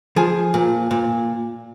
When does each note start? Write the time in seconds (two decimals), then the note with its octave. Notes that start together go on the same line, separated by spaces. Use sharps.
0.16 F3 G#4
0.54 A#2
0.91 A#2